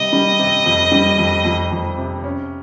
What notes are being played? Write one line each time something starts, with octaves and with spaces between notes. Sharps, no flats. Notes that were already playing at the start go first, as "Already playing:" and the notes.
Already playing: C3 G3 D#5
G3
C3
F2
G3
F2
F2
F2
C3
C#4